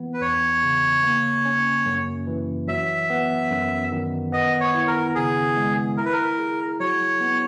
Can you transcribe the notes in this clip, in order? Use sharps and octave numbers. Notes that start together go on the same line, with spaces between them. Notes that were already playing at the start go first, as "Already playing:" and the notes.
Already playing: E3 B3
B4
E2 C#5
C#3
A#3
C#4
F#2
E3
F#3 E5
B3
F#2
D#3
B3 D#5
C#5
E4
A#4
C#3 G#4
G#3
E4 A#4
B4
A#4
G#4
F#3 C#5
B3